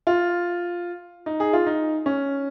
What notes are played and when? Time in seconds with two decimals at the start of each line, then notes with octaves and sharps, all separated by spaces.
0.07 F4
1.26 D#4
1.40 G#4
1.53 F4
1.66 D#4
2.06 C#4